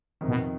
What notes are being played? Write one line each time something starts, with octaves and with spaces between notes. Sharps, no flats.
F2 C3 D#3
B2